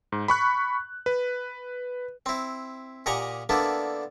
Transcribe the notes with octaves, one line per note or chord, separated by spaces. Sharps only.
G#2
B5 C#6 F#6
B4
C4 E4
A#2 G4 D#5 F#5 G#5 A#5
D3 A#3 B3 D4 E4